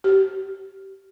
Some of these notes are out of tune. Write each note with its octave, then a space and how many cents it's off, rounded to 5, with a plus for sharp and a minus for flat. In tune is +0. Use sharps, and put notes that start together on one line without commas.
G4 -20